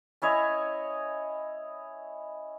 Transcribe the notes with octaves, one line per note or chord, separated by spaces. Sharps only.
C#4 E4 C#5 D#5